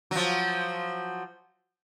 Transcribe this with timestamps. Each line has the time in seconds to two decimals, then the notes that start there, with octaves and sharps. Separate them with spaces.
0.11 F3 F#3